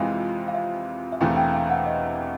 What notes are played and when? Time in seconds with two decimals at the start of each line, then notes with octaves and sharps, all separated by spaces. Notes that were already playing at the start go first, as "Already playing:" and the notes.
Already playing: F2 C3 E3 G#3 F5
0.48 F5
0.54 E5
1.12 E5
1.20 E1 E2 C3 E3 A3 F5
1.37 G5
1.53 F5
1.70 F#5
1.86 D#5